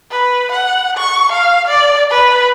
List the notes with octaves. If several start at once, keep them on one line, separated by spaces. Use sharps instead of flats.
B4
F#5
C#6
F5
D5
B4